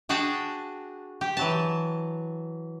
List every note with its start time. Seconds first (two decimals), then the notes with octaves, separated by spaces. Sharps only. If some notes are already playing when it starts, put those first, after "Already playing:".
0.09 D4 F#4 G#4 G5 A5
1.21 G4
1.37 E3 F#3 A5